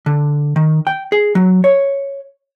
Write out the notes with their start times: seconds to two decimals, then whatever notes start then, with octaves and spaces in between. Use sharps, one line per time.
0.06 D3
0.56 D#3
0.87 G5
1.12 G#4
1.35 F#3
1.64 C#5